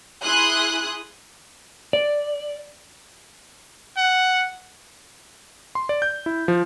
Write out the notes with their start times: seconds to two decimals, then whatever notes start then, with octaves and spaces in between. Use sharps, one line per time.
0.23 E4 G#4 C6 D#6 F#6
1.93 D5
3.97 F#5
5.75 C6
5.89 D5
6.02 G6
6.26 E4
6.48 F3